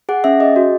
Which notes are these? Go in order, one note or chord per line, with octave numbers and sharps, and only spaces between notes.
G#4 F#5
C#4 E5
G#4 D#5
F#4